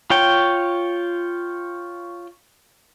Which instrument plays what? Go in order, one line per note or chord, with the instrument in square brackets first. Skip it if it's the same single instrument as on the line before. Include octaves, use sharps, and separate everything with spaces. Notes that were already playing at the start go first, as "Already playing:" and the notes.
[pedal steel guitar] F4 C#5 G5